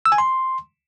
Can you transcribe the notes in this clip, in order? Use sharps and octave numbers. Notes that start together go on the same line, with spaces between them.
E6
G#5
C6